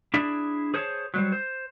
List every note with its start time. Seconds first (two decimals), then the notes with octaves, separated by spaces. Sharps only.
0.14 D4 E4 G#4 D5 E5
0.74 G#4 C5 C#5 A5
1.14 F#3 G3 C5
1.32 C5